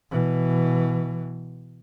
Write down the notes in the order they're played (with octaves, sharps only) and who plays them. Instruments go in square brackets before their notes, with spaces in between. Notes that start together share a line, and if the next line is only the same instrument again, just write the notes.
[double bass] B2 E3